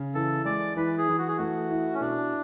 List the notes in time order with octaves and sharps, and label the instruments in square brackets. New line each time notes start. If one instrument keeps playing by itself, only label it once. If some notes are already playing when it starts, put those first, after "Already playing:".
Already playing: [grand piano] C#3
[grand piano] E3 [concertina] A4
[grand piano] G#3 [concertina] D5
[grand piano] E3 [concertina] B4
[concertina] G#4
[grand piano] E3
[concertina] F#4
G#4
[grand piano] A3 [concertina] F#4
[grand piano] E4
[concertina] C#4
[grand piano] B2 [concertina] D4